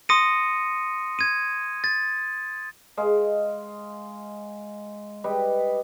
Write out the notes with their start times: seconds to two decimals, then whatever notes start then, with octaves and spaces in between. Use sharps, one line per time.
0.09 C6 D#6 A#6 C#7 D#7
1.19 G#6 D#7
1.84 A6
2.97 G#3 D#5 F5
5.24 G3 B4 D#5